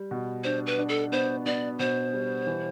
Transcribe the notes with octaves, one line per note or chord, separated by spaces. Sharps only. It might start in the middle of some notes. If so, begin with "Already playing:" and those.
Already playing: G3
B2
D4 C5
B4
D4
A4
B3 C5
B3 D5
B2 C5
G3
E3